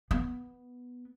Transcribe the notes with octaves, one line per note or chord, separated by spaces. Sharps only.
B3